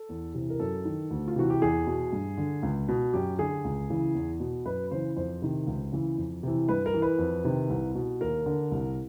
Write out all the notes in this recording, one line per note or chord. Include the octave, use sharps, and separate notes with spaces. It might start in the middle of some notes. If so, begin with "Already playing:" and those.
Already playing: A4
E2
C3 E3
A#4
F#2 A4
D#3
D2
F4
C3 E3 F#4
G4
E2 G#4
B2
G2
D3
C#2
B2
F#2 G4
D3 G#4
C#2
C#3 E3
E2
B2
F#2 B4
C#3 E3 C5
F2 C5
C3 D#3
C#2
C#3 E3
F2
C3 E3
G2 B4
A#4
E3
B4
F2
C3 D#3
C2
B2
D#2 A#4
D3
C2